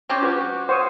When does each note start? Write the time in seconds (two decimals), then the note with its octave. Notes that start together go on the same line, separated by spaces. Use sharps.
0.09 C4 C#4 G4
0.22 F4 F#4 B4 D6
0.69 F#4 C5 C#5 F5 F#5 C#6 D#6